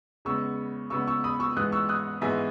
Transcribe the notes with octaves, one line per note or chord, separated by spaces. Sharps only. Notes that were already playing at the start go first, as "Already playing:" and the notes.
E2 C#3 G#3 B3 C#6 E6
E2 C#3 G#3 B3 C#6 E6
C#6 E6
B5 D#6
C#6 E6
G#2 E3 G#3 B3 D#6 F#6
C#6 E6
D#6 F#6
G#2 E3 G#3 B3 E5 G#5